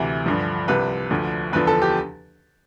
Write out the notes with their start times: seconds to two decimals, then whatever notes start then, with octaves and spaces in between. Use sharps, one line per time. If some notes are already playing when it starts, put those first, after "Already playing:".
Already playing: D2 C3 E3
0.26 G2 D3 F3
0.68 C2 C3 F3 B4
1.11 D2 D3 F3
1.53 E2 D3 F3 B4
1.67 A4
1.82 G4